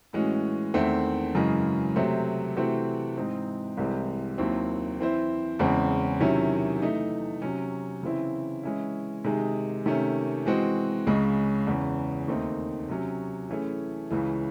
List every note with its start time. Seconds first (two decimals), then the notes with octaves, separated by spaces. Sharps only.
0.13 A2 E3 G#3 C#4 F#4
0.74 E2 D#3 A3 C4 E4
1.35 F#2 C#3 E3 G#3
1.96 C3 F#3 A3 C4
2.56 C3 E3 A3 C4 F#4
3.17 G#2 E3 C4 D#4
3.77 C2 C3 E3 G#3 C4
4.38 D#2 D#3 F#3 C4 E4
4.99 E3 C4 E4 C5
5.59 E2 C#3 G#3 C4
6.20 C3 D#3 F#3 C#4 E4
6.82 E3 A3 D#4
7.42 C3 F#3 C#4
8.03 C#3 E3 C4 E4
8.63 E3 G#3 C#4 E4
9.24 C3 D#3 G#3 D#4 G#4
9.86 C3 D#3 A3 C#4
10.46 E3 G#3 C4 F#4
11.07 C#2 C#3 G#3
11.67 E2 C#3 E3
12.28 D#2 D#3 A3 C4 D#4
12.89 C3 F#3 C#4
13.49 E3 A3 C#4 E4 G#4
14.11 C#2 C#3 E3